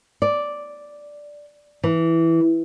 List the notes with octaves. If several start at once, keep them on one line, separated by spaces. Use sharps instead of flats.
D5
E3